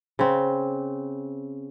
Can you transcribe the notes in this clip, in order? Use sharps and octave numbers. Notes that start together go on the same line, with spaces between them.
C#3 C4